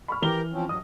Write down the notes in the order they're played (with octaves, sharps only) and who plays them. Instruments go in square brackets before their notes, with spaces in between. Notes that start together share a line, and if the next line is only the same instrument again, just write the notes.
[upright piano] B5 C#6 F6
[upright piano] E3 F7 G7 [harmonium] G4 A#4 A#5
[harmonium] F3 C4 C#4
[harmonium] G2 F#3 D#5 [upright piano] D#6